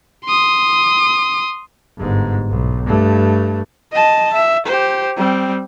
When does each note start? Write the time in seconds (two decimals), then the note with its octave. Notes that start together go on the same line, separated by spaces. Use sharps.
0.25 C6 D#6
1.97 G1 G#2
2.50 B1
2.85 G2 A3
3.93 D#5 A5
4.33 E5
4.66 G4 C5
5.17 G3 C4